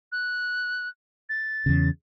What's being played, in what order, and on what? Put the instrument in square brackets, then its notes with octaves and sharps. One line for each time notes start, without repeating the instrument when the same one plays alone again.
[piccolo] F#6
A6
[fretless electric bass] E2 C#3